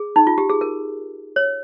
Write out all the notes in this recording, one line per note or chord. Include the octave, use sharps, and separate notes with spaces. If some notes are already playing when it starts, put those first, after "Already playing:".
Already playing: G#4
D#4
F4
G4
G#4
A#4
C#5